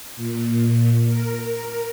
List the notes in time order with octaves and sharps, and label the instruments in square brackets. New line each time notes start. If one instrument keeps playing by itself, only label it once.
[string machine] A#2
A#4